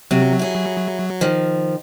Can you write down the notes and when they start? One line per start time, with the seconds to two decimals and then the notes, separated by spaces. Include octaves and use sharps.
0.11 C3 F#3
0.39 E4 G#4
1.21 D#3 F3